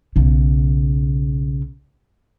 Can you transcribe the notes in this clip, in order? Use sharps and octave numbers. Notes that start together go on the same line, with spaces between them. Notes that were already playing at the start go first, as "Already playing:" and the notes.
B1 C#3